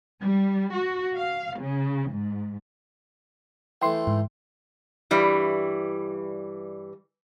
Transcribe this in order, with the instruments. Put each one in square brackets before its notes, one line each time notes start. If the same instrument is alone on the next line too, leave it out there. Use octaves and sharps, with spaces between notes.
[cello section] G3
F#4
F5
C#3
G#2
[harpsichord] E3 A3 [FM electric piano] G5 C6
[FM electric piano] G#2
[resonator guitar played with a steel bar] G2 E3 G3